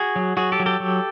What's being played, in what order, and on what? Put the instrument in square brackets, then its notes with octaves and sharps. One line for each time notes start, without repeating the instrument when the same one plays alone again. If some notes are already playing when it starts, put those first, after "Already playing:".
Already playing: [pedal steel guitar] F#4 G#4
F#3
F#3 F#4 G#4
G4 A4
F#3
G4 A4
F#3